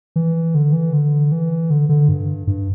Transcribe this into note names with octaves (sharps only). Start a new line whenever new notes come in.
E3
D3
E3
D3
E3
D3
D3
G2
G2